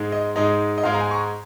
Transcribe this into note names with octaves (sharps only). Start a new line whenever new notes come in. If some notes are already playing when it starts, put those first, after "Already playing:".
Already playing: G#2 G#3 D#4
D#5
G#2 G#3 D#4 D#5
D#5
G#2 G#3 D#4 F5
A#5
G#5
C#6
A#5